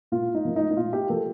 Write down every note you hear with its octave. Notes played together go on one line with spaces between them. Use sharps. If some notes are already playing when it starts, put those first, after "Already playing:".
A#2 F4
D#4
F3 A#3
D#4
D#4
A#2 F4
G4
F3 A#3 A4